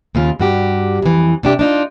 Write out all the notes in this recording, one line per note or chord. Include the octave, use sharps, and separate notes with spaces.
D#2 C#3 F4
G2 F#4 G4
F2 E3
C3 D4 G4
D4 D#4 F4